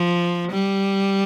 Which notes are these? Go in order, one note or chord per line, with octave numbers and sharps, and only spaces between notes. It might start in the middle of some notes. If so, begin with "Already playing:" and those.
Already playing: F3
G3